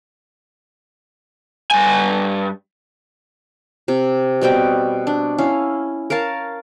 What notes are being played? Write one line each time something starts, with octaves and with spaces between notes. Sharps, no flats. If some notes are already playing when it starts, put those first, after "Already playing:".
G2 G#5
C3
B2 G3 C4 G5
D4
C#4 E4 F5
A#4 C#5 F5 A5